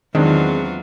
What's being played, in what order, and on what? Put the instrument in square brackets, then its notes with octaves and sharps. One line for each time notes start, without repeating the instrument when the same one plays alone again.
[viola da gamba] E2 F#3 F4 [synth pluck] D#3 [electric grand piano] G#3 C4 D4